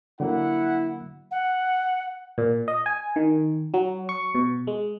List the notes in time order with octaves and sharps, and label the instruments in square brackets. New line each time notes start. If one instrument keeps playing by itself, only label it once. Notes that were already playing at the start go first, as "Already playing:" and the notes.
[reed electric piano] D3 F#3 A#3 [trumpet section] E4 F#5
[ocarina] F#5
[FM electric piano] A#2
D#5
G#5
D#3
F#3
C#6
B2
G#3